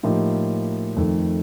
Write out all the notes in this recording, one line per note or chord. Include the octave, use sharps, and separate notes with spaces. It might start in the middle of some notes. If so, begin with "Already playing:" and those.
A2 F3 A#3 D#4 G4
F2 D#3 A3